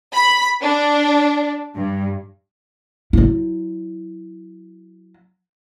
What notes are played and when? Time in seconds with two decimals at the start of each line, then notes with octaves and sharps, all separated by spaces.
0.14 B5
0.62 D4
1.75 G2
3.13 F#3 E4